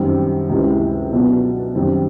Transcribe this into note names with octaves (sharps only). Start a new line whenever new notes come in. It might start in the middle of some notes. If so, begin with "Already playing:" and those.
Already playing: F#2 D#3 G3 C4
C#2 C3 E3 G#3
B2 F#3 B3 D4
F#2 D#3 G3 C4